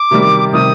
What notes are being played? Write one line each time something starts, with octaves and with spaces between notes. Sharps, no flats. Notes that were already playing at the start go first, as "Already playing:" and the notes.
Already playing: D6
C3 D#3 G3
C3 D#3 G3 D#6